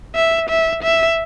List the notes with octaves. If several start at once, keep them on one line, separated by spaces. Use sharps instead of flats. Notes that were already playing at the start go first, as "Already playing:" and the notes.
E5
E5
E5